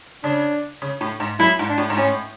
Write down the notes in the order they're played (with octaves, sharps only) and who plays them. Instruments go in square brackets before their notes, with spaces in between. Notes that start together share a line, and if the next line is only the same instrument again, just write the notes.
[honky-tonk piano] C#3 [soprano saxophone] D4
[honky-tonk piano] C#3
A2
G#2
[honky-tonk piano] F#2 [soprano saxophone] E4
[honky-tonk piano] G#2
[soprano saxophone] D4
[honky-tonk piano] A2
G#2
[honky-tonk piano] A2 [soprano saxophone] C#4